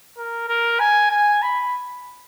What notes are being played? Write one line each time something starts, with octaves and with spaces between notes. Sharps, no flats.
A#4
A#4
G#5
G#5
B5